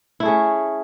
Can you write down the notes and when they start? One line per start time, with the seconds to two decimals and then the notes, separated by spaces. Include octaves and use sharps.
0.20 E4
0.23 A3
0.25 G#4
0.28 C#4